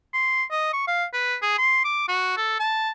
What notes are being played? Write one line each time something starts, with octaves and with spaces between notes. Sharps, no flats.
C6
D#5
C#6
F5
B4
G#4
C6
D6
F#4
A4
A5